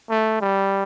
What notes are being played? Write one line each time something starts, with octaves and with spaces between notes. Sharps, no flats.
A3
G3